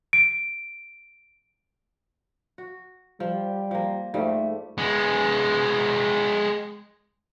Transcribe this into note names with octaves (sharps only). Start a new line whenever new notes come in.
D7
F#4
F3 G3
F3 A#3
G#2 F3 G3 A3
G#3 B3